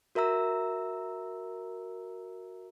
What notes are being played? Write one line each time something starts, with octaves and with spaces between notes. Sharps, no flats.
F#4 A#4 E5 A#5 E6